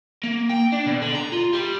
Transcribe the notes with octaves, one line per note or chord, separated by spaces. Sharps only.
A#3
G5
D4
B2
D3
A#5
F4
G3